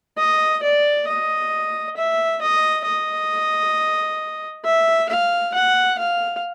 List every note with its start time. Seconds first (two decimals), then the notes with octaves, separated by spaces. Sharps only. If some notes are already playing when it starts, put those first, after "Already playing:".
0.18 D#5
0.63 D5
1.08 D#5
1.97 E5
2.41 D#5
2.86 D#5
4.65 E5
5.09 F5
5.54 F#5
5.99 F5